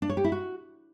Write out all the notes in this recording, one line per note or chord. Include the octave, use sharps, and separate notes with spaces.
D4
C#5
G4
E4
F#4